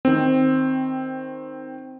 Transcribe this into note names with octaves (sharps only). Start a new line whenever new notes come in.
D#3 C4